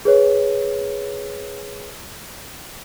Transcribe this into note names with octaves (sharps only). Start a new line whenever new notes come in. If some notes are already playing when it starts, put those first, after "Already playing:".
G#4 B4 C#5